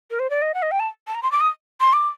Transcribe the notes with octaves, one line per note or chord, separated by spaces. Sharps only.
A#4
C5
D5
D#5
F#5
D#5
G5
A5
A5
A#5
C6
D6
D#6
C6
D6